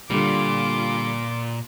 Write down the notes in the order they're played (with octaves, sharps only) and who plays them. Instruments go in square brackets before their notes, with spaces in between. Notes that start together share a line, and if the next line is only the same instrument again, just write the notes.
[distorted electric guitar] A#2 [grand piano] D3 G3 [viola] F4 D6